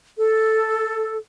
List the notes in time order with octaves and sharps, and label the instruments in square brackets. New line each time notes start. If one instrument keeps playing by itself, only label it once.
[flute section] A4